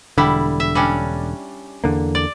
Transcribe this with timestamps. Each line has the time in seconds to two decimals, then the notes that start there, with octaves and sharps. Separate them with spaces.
0.18 E1 D3 G3 E4
0.60 E5
0.75 G3 C#4 D4
1.84 E2 D3 A#3
2.15 D5